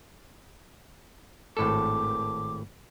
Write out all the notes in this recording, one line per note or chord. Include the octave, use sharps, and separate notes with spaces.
G#1 A2 A4 D6